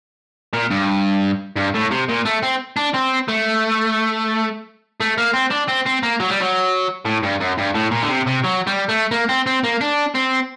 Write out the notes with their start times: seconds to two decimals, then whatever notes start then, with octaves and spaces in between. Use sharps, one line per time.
0.54 A#2
0.71 G2
1.56 G2
1.74 A2
1.91 C3
2.09 A#2
2.25 A3
2.43 C4
2.77 D4
2.94 C4
3.28 A3
5.00 A3
5.18 A#3
5.34 C4
5.51 D4
5.68 C4
5.86 C4
6.03 A#3
6.20 F#3
6.30 G3
6.40 F#3
7.05 A2
7.23 G2
7.41 F#2
7.58 G2
7.75 A2
7.91 A#2
8.02 D3
8.09 C3
8.26 C3
8.44 F#3
8.67 G3
8.89 A3
9.11 A#3
9.29 C4
9.46 C4
9.64 A#3
9.81 D4
10.15 C4